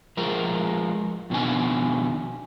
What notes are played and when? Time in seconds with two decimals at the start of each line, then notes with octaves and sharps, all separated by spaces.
0.17 F3 G#3 A#4
1.30 F2 B2 D#3 D4 G#5